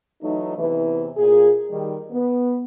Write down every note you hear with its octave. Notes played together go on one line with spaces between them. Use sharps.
E3 F#3 A3 D#4
E2 C3 E3
A#2 G#4
D#3 G3
B3